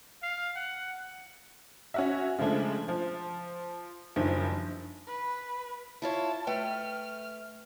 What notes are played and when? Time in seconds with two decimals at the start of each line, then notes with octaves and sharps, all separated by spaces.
0.22 F5
0.56 F#5
1.94 C#4 F#4 E5
2.38 C#3 F3 G#3 A3 D4
2.88 F3
4.16 F#1 G2 D#3 F3
5.07 B4
6.02 E4 F4 C#5 A5
6.47 A3 B4 G5 F6